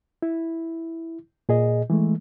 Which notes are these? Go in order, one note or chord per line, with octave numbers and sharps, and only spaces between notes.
E4
A#2 G#4 D#5
E3 G#3 A3